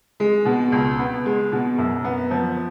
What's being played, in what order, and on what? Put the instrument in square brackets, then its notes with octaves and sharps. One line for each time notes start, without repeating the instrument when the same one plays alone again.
[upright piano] G#3
B2
C#2
B3
G#3
B2
F#2
B3
F3